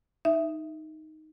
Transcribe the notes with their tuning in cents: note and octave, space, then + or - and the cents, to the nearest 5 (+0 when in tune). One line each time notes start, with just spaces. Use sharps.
D#4 +0 E5 +0